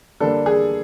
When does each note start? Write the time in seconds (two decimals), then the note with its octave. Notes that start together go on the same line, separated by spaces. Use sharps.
0.20 D3 G3 A#3 D4 A4
0.46 G#4